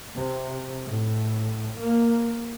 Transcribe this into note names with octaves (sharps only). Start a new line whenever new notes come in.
C3
A2
A#3